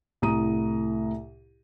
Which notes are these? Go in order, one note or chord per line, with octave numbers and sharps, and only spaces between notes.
C2 A2 E4 A#5 D#6 D#7